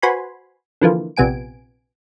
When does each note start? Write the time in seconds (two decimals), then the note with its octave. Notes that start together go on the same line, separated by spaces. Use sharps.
0.02 F#4 B4 C5 G#5 B5 C6
0.81 D3 E3 F3 A#3
1.17 A#1 C3 B3 G#5 D7